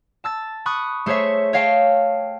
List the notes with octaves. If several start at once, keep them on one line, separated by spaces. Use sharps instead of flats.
A5 E6 A6
B5 C#6 D#6 F#6
A3 G#4 C5 C#5 E5
C#5 D#5 F5 G5 A5